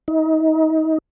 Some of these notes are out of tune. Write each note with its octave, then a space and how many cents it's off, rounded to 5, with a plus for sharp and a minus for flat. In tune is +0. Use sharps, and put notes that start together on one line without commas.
D#4 +30